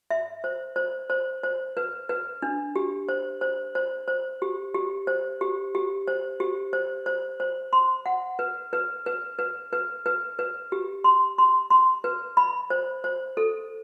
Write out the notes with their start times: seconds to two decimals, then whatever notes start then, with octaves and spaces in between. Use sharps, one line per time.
0.11 E5
0.44 C5
0.76 C5
1.10 C5
1.43 C5
1.77 B4
2.09 B4
2.42 D4
2.76 G4
3.09 C5
3.41 C5
3.75 C5
4.08 C5
4.42 G4
4.75 G4
5.07 C5
5.41 G4
5.75 G4
6.08 C5
6.40 G4
6.73 C5
7.06 C5
7.40 C5
7.73 C6
8.06 F#5
8.39 B4
8.73 B4
9.06 B4
9.39 B4
9.73 B4
10.06 B4
10.39 B4
10.72 G4
11.04 C6
11.38 C6
11.70 C6
12.04 B4
12.37 B5
12.70 C5
13.04 C5
13.37 A4